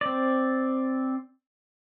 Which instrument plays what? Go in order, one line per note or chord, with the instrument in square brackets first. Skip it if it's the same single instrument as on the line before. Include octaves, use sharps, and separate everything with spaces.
[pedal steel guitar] C4 D5